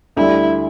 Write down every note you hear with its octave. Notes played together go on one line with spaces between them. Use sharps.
D2 D3 G3 E4